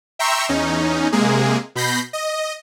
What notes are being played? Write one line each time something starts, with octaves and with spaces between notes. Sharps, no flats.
E5 G5 A#5 C6 C#6 E6
E2 C#4 D#4
C3 G#3 A#3 G#4
B2 B5 G6 A#6 C7
D#5